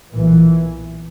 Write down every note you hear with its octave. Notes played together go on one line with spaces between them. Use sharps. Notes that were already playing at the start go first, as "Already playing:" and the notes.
B1 A#2 E3